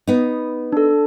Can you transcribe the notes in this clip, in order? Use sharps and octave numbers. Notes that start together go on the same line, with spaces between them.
B3 D#4
D4 A4